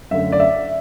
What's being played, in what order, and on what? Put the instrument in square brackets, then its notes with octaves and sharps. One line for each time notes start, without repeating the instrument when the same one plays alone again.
[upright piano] F#2 D3 A3 E5
D5
E5